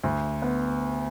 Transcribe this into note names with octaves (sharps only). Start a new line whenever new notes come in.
D2
B3